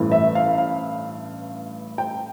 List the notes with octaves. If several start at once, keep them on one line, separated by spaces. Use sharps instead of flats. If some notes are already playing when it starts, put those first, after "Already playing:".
Already playing: A1 G2 E3 A3
E5
F5
F5
G5